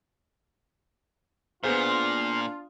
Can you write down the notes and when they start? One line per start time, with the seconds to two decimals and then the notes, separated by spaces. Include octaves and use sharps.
1.64 A#2 B3 D4 F4 G#4 C5 F5